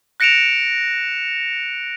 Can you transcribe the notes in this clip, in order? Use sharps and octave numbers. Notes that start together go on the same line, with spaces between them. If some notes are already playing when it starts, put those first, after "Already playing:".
F#6 A#6 C#7 D7 E7 F7